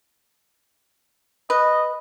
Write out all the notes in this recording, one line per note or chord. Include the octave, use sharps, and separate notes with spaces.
B4 D#5